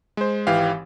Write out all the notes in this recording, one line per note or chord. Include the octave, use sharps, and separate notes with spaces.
G#3 C5
G#1 E3 G4 F5